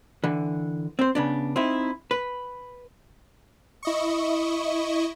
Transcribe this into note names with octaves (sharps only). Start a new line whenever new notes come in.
D3 E3
C4 C5
C#3 B3 D4
C4 D#4 E4
B4
E4 D#5 C#6